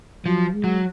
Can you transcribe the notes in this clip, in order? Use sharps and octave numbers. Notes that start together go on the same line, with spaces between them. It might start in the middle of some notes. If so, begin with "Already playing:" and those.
F3 F#3
G#3
F#3